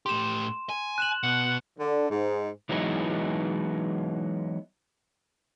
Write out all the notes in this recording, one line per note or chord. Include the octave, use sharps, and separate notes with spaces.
A2 G4 C6 E7
G#5
F#6 E7 F#7
B2 F#5
D3
G#2
E3 F#3 G#3 B3 D#4 E4